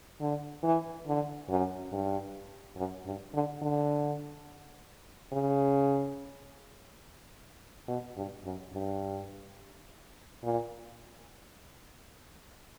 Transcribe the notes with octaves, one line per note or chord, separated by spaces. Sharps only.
D3
E3
D3
F#2
G2
F#2
G2
D3
D3
C#3
B2
G2
F#2
G2
A#2